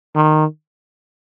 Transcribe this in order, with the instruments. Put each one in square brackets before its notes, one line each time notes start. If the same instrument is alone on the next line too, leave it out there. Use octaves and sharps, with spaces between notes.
[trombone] D#3